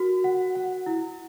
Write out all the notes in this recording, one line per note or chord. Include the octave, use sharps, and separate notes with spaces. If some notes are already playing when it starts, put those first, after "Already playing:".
Already playing: F#4 A#4
F#5
F#5
E4